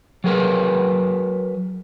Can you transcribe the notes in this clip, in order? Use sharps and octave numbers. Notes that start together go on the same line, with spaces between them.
F#3 G#4 A#4 B4